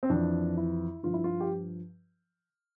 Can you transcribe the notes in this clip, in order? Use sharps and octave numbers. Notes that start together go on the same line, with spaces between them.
C4
F2 E3 D4
E4
G2 F3 F4
E4
F4
G4